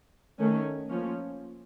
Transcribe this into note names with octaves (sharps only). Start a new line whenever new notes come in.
D#3 A3 C#4
F3 A#3 C#4